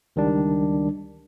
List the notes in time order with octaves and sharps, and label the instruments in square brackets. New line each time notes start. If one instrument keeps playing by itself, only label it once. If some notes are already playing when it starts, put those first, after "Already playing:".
[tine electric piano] C#2 D#3 G3 D4